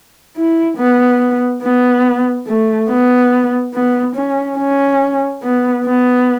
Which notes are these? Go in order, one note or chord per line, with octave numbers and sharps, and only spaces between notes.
E4
B3
B3
A3
B3
B3
C#4
C#4
B3
B3